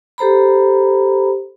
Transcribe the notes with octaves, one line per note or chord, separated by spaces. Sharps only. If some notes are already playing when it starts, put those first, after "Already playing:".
G4 A4 C5 A#5 B5